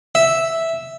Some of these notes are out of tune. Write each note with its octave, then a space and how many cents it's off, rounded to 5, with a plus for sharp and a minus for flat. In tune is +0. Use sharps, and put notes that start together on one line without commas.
E5 -5